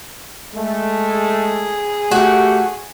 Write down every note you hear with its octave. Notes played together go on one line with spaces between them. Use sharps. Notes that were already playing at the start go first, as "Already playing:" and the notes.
G#3 A3
G#4
A3 F#4 G4